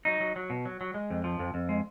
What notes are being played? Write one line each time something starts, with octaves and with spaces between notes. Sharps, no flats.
F#3 D#4
F#3
F#3
B2
F#3
F#3
G#3
F2
F3
F2
F2
G#3